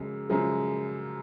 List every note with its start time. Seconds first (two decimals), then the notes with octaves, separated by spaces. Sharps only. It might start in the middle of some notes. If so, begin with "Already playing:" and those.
Already playing: F#2 C#3 F3 G#3
0.29 F#2 C#3 F3 G#3